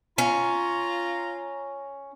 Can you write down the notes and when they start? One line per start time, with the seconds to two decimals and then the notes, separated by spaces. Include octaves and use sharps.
0.18 C#4 F4 A#5